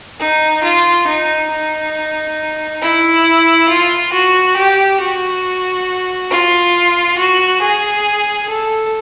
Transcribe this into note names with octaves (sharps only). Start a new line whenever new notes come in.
D#4
F4
D#4
D#4
E4
F4
F#4
G4
F#4
F4
F#4
G#4
A4